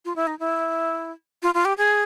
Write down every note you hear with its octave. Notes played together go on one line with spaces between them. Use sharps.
F4
E4
D#4
E4
F4
F4
G4
G#4